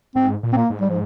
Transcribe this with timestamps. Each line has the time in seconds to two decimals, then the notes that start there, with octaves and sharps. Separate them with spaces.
0.16 G#2 C4
0.43 A#2
0.53 C4
0.57 A#3
0.70 G#2
0.81 G3
0.90 F3